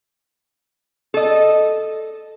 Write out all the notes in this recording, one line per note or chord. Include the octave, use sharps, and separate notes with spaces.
A4 D#5